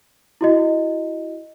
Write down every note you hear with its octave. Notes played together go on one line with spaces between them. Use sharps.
E4 F#4 D#5